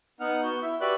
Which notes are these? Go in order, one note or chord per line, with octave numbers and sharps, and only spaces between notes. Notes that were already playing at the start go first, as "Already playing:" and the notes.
B3 D#4 F#5 F6
B3 F#4 G6
E4 E5
F#4 G4 B4 D5 E5 F#6